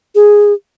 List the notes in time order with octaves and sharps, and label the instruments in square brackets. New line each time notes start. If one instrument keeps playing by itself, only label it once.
[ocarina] G#4